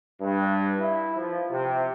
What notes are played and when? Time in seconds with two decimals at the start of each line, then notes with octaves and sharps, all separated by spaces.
0.21 G2
0.78 E4
1.16 F3
1.49 C3